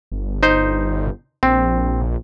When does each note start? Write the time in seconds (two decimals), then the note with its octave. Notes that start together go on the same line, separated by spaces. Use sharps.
0.12 G1
0.43 D#4 C5
1.43 A#1 C4